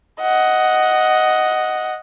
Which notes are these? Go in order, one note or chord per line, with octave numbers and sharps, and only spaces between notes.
D#5 F#5